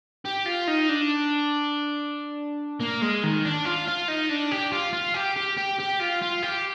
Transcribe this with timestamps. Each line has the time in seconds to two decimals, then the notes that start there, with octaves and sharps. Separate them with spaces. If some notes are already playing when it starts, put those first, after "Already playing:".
0.25 G4
0.46 F4
0.67 D#4
0.89 D4
2.80 A#3
3.02 G#3
3.23 D#3
3.45 D4
3.65 F4
3.88 F4
4.08 D#4
4.29 D4
4.51 G4
4.72 F4
4.93 F4
5.14 G4
5.36 G4
5.57 G4
5.79 G4
6.00 F4
6.21 F4
6.42 G4